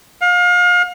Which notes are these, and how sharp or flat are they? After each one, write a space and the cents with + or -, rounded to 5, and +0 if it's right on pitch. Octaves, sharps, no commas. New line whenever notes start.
F5 +35